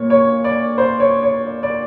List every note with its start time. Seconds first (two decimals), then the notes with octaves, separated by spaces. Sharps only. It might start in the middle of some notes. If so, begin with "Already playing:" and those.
Already playing: A#2 C#5
0.10 C#5
0.44 D5
0.78 C5
1.00 C#5
1.23 C#5
1.46 D5
1.63 D5